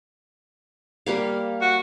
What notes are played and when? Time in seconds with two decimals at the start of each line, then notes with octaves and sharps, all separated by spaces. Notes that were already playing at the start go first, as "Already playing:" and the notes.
1.06 G3 A#3 F5
1.61 F#4